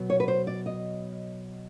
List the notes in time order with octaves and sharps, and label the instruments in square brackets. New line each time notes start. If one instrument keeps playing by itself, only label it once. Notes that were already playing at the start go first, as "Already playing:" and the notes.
Already playing: [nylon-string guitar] B2 F#3 B3
C#5
B4
C5
D5
D#5